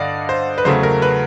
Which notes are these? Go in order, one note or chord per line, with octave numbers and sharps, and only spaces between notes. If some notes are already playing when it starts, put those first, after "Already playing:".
Already playing: G2 D3 D5 D#5 F5 F#5
C5
B4
E2 C#3 F#3 A3 C5
A#4
B4